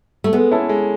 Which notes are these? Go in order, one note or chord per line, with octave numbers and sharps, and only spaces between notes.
A3
G#3 B3
C#4 E4 A4
G#3